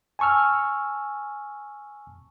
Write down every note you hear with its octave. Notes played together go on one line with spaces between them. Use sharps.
G#5 A5 C#6 E6 F6